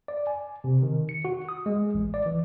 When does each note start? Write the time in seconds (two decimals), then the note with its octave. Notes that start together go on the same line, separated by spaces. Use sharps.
0.08 D5
0.27 G#5
0.64 C3
0.82 D#3
1.09 C#7
1.25 F#4
1.49 D#6
1.66 G#3
1.95 A1
2.14 D5
2.26 E3